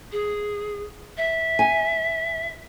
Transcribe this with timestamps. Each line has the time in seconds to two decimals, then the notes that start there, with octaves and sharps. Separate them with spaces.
0.12 G#4
1.17 E5
1.59 G#5